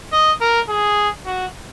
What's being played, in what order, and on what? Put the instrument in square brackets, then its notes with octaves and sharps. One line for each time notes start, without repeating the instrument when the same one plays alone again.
[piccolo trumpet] D#5
A#4
G#4
F#4